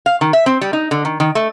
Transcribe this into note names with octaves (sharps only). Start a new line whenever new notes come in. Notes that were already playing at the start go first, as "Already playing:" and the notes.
F5
D#3
E5
C4
G3
D#4
D3
D#3
D#3
A3